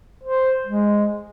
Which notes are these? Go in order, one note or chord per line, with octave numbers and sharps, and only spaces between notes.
C5
G#3